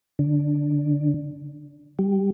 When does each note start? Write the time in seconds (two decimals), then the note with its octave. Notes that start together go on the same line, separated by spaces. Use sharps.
0.19 D3
1.99 G3